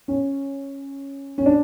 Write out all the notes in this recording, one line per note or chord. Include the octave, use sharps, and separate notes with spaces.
C#4
C#4
D4